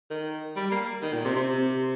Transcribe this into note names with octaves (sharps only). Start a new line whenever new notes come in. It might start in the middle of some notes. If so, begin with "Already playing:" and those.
D#3
G3
A#3
D#3
A#2
C3
C3